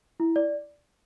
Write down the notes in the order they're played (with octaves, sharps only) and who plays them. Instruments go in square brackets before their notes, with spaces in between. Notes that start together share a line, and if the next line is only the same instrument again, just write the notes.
[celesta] E4
D5